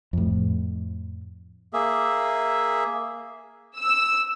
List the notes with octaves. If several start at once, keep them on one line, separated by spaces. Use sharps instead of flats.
F2 A2
A#3 G#4 E5
E6